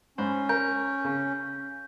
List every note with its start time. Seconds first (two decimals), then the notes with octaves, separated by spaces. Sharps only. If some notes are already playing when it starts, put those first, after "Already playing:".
0.18 G#2 C#4 C5 B5
0.49 A#4 G6
1.04 C#3